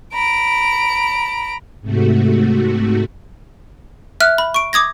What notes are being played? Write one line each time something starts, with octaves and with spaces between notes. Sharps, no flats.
A#5 B5 D7
G#2 C3 A3 F#4
E5 F6 F#6
B5
C#6 D7
D6 D#6 G#6 A#6